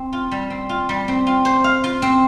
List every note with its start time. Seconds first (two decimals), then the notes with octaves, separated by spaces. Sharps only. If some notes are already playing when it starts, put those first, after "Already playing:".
Already playing: C4
0.13 F4
0.31 G3
0.50 C4
0.69 F4
0.89 G3
1.08 C4
1.27 F4
1.45 C5
1.64 F5
1.84 F4
2.02 C4